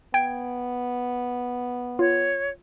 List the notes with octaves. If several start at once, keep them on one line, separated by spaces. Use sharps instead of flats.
B3 G5 G#6 D7
F4 C#5